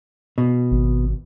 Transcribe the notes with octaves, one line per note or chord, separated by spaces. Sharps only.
B2
G#1